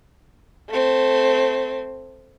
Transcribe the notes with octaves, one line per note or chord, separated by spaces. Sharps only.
A3 C4